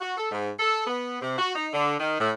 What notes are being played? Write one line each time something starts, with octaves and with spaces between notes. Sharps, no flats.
F#4
A4
G#2
A4
B3
C3
F#4
D#4
D3
D#3
A2